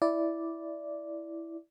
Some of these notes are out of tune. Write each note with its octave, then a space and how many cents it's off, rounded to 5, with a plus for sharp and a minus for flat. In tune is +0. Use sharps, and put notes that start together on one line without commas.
E4 +0 D5 -5